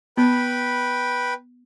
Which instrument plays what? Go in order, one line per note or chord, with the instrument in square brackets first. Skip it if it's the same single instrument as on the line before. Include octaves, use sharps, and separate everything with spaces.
[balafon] B3 [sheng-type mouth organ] B4 G5 B5